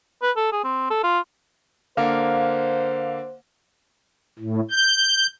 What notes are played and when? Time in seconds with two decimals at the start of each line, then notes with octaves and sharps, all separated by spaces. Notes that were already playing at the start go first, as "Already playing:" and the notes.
0.22 B4
0.37 A4
0.52 G#4
0.64 C4
0.90 A4
1.03 F4
1.97 D3 A#3 C5 F5
4.39 A2
4.71 G6